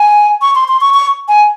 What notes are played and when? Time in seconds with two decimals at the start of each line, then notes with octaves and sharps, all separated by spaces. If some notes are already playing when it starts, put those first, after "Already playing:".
Already playing: G#5
0.41 C#6
0.55 C6
0.68 C6
0.81 C#6
0.94 C#6
1.28 G#5